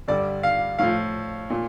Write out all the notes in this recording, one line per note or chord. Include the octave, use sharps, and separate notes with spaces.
G2 D3 G3 D5
F5
A2 F3 F5
A#2